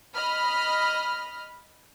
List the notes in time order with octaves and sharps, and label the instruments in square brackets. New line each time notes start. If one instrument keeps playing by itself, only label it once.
[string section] D#5 B5 F6